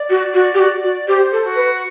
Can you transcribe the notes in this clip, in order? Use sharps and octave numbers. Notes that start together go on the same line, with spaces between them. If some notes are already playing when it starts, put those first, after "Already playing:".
Already playing: D5
F#4
F#4
G4
F#4
F#4
G4 C5
A4
F#4
B4